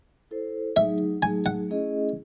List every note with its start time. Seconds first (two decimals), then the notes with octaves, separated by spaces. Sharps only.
0.31 E4 A4 C5
0.76 F#3 A3 D#4 G#4 E5
1.22 F#3 A3 D#4 G#4 G#5
1.46 F#5
1.69 A3 C#4 E4 G#4 D#5